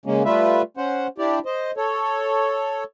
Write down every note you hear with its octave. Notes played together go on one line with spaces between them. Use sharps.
C#3 G#3 A#3 C#4
G3 A3 F4 B4 E5
C#4 C5 F#5
D4 E4 G4 D5
C5 D#5
A4 C#5